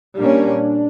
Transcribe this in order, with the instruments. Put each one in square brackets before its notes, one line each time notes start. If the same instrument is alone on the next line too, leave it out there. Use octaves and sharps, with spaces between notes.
[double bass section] A#2 G3 A#3 C#4 [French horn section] D4